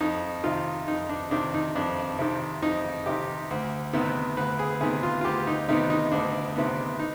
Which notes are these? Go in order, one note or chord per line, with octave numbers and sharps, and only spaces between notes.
F2 D#4
C3 D#3 F4
F2 D#4
D4
C3 D#3 D4
D#4
F2 D4
C3 D#3
F2 D#4
C3 D#3 G4
D2
C3 D#3 B3
D2 B4
G#4
C3 D#3 B3 G#4
F4
F4
D2 G4
D#4
C3 D#3 B3 D#4
D#4
D2 D4
C3 D#3 B3
D#4